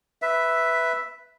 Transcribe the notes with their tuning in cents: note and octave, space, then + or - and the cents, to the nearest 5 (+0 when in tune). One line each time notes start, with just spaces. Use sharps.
B4 +0 E5 +0